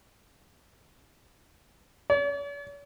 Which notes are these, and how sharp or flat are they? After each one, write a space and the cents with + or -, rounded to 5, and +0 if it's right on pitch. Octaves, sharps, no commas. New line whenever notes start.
C#5 +45